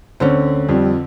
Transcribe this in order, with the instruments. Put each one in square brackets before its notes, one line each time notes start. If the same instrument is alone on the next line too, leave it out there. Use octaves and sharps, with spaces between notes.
[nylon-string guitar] D2 C#4 [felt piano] D3 C4
[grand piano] F2 [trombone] G3